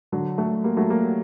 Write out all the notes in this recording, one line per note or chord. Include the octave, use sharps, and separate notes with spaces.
D3 F#3
F#3 A3
G3 A#3
F#3 A3
G3 A#3